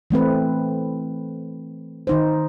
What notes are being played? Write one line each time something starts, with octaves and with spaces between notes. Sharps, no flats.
E3 A3 C4 B4
D#3 D#4 C5